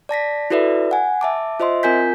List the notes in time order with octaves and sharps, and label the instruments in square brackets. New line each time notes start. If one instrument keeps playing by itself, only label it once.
[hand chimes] D5 A5 A#6 B6
E4 F#4 A4 B4 D5 E5
F#5 G#5
E5 A5 D6
F4 C5 D#5 E5 C6
C4 F4 A#4 G#5 G6 B6